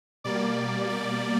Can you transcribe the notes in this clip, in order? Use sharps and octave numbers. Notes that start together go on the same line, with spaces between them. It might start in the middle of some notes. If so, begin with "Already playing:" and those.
B2 G3 A#3 D5
D5